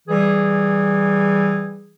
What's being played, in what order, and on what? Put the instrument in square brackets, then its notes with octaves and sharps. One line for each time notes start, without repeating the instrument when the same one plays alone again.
[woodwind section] E3 G3 G#4